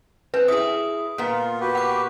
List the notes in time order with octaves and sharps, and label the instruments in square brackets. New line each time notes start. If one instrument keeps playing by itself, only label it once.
[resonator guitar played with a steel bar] C4 [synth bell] B4
[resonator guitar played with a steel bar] E4 G#4 [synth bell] D#6
[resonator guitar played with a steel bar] A#2 B3 [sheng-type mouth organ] F4
[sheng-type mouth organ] F#4 G4 B4
[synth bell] F#5 D6